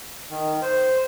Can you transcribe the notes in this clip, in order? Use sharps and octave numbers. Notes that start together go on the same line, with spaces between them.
D#3
C5